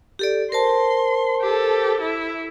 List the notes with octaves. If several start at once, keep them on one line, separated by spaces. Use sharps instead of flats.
G4 A4 D5
A#4 C5 A5 C6
G4 A4
E4